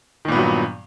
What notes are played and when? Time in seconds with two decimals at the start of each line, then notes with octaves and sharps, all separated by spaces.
0.25 D#3
0.28 A#2
0.32 B3
0.35 G2
0.39 F#3